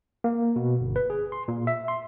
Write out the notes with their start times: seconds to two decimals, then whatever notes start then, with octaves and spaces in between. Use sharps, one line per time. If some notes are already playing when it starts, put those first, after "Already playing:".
0.24 A#3
0.56 B2
0.81 G1
0.96 B4
1.10 G#4
1.32 C6
1.48 A#2
1.67 E5
1.88 C6